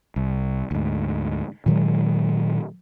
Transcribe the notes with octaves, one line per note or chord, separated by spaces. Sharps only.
C2
D2 G#2
A#2 D#3 F#3 G#3